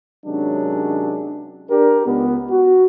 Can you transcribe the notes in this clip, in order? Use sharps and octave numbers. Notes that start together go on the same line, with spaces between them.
C3 D#3 F#3 G#3 C#4 D4
D4 G4 A#4
C#2 B3
F#4